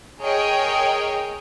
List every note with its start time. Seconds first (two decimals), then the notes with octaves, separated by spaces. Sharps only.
0.21 G#4 A#4 C#5 D#5 G5